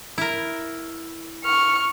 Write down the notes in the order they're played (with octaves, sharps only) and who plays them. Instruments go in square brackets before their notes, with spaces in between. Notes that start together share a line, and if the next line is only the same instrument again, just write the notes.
[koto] E4 A#4
[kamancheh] C#6 F6